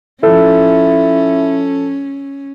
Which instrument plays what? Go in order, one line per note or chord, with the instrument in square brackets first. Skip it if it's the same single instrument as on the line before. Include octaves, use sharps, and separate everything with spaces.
[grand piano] F3 A4 [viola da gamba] C#4 [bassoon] E4